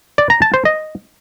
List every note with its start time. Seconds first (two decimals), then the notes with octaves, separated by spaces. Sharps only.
0.18 D5
0.30 A#5
0.42 A5
0.54 C5
0.65 D#5